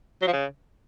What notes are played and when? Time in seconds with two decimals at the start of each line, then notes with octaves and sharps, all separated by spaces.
0.22 F#3
0.27 F3
0.33 C#3